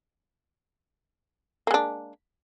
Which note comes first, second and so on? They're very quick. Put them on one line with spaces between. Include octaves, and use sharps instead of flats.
A#3 G#3 D4